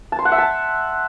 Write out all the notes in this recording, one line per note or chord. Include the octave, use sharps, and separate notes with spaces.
A5
C6
F#5
E5
A5